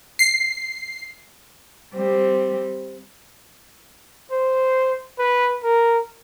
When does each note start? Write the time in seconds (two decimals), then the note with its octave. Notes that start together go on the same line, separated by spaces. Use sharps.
0.19 C7
1.93 G3 C4
4.32 C5
5.19 B4
5.63 A#4